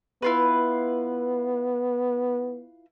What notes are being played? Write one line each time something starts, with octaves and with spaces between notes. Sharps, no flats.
B3 E4 F4 B4